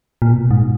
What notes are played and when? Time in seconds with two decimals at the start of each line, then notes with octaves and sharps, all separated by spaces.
0.22 A#2
0.32 B2
0.51 G#2